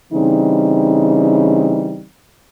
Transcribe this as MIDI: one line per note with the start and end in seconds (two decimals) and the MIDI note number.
0.13 2.05 49
0.13 2.05 52
0.13 2.05 55
0.13 2.05 60
0.13 2.05 63